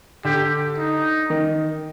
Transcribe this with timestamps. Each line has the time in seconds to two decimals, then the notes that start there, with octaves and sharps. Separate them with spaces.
0.25 D3 G4
0.78 D#4
1.30 D#3